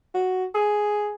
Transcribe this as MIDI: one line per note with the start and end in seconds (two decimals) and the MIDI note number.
0.15 0.45 66
0.55 1.13 68